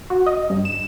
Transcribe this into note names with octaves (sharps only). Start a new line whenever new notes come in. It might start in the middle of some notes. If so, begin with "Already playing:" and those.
F#4
D#5
G2
E7